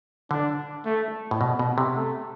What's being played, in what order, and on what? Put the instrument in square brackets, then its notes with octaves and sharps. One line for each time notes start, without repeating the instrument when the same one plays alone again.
[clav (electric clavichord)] D3 [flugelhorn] D4
[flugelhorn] A3
[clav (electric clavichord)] A2
B2
B2
C3
[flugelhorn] A3